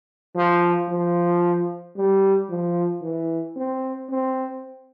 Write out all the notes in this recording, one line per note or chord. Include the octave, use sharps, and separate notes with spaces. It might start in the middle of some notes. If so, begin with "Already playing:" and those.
F3
F3
G3
F3
E3
C4
C4